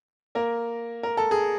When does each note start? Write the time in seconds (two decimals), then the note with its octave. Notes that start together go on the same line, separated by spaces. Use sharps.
0.35 A#3 A#4
1.03 A#4
1.17 A4
1.31 G#4